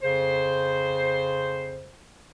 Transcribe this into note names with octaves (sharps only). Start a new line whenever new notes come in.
F2 C#3 C5